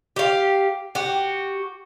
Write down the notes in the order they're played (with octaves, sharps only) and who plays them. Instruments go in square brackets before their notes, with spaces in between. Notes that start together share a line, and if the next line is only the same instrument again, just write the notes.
[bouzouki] G4 F5
F#4 G4